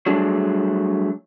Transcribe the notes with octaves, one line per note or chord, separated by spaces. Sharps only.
F#3 G3 A3 D4 G#4